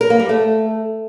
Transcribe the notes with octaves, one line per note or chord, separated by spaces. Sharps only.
A#4
A#3
G3
A3